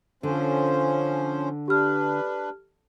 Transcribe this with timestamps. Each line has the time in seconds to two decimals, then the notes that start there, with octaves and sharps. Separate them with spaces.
0.23 D3 F3 C#4 C5
1.68 D4 G4 B4 F6